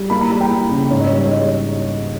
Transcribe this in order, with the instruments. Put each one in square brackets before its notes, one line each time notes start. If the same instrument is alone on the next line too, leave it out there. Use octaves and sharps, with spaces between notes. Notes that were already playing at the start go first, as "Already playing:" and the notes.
Already playing: [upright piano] G3
A#3 B5
A#5
G3 B5
G5
A#3
C#3
G#2 C#5
D#5
C#5
G3 D#5
C#5
G3 D#5
C#5